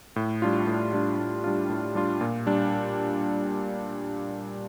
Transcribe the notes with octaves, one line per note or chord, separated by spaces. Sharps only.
A2
G3 D4 F4
A2
G3 D4 F4
A2
G3 D4 F4
A2
G3 D4 F4
A#2
G3 D4